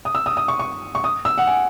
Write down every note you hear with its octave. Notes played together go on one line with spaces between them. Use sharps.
D#6
E6
D#6
D#6
C#6
C#6
C#6
D#6
E6
F#5
G#5